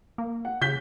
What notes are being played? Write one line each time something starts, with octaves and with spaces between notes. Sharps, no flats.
A#3
F#5
C#3 G6 B6 G7